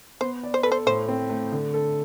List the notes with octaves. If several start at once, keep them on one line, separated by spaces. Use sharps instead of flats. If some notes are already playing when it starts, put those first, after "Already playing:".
B3 C5
D5
C5
A4 B4
C5
A2 C5
C4
A3
D3
A4